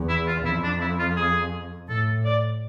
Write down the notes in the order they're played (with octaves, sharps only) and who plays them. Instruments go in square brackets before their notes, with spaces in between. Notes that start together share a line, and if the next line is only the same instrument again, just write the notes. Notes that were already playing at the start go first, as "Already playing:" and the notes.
Already playing: [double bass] E2
[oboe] E4
F4
[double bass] F2 [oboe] E4
[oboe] D4
E4
F4
G#4
[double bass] A2 [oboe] A4
[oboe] D5